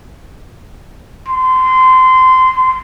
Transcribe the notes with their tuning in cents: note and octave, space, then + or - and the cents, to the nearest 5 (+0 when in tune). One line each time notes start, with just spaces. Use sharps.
C6 -20